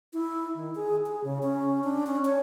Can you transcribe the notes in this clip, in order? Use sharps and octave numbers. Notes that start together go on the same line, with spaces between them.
E4
D#3
G#4
G#4
C#3
C#4
D4
C#4
C#5